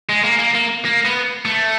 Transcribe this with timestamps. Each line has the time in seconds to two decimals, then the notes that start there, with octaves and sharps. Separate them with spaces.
0.09 G#3
0.24 A#3
0.39 A#3
0.55 A#3
0.85 A#3
1.05 B3
1.45 A3